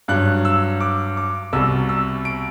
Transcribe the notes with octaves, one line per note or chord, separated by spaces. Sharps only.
G2 F#3 F#6
E6
D6
D6
C2 B2 G3 E6
E6
D7